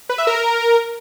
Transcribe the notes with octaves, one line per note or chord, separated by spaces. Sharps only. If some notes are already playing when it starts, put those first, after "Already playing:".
B4
E5
A#4